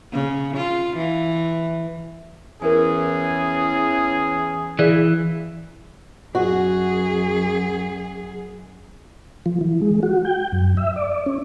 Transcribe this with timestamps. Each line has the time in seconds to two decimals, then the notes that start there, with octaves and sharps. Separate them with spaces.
0.12 C#3
0.57 F4
0.97 E3
2.62 E2 E3 C#4 G#4 A#4 G#5
4.79 E3 G#4 D5 F5
6.35 F#2 F#4 G#4
9.46 F3
9.61 E3
9.82 G#3
10.03 F#4
10.25 G5
10.52 F#2
10.77 E5
10.96 D5
11.26 C#4